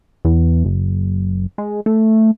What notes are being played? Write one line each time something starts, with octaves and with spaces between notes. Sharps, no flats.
E2
F#1
G#3
A3